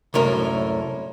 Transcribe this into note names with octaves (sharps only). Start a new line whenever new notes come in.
C2 F#2 A2 A#4